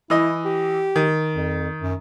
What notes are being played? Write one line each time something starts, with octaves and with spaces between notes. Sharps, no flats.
E3 E4 D#5
G4
D#3
F2
F#2